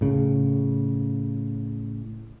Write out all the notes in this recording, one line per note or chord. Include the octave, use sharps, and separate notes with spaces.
A2 C#3